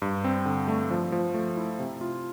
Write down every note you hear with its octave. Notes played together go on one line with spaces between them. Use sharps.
G2
C4
D3
A3
F3
F3
A3
E4
C3
F4